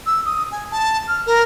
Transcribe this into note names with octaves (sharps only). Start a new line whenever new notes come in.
E6
D#6
G#5
A5
F6
A#4